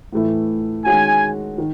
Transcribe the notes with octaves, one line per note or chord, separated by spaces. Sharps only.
A2 E3 A3 E4
D#3 G#3 C#4 F#4 G#5
D#3